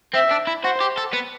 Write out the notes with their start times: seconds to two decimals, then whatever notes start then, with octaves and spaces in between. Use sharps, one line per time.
0.14 C4 E5
0.31 D4
0.47 E4
0.64 F#4 C5
0.80 G4
0.97 A4
1.13 B3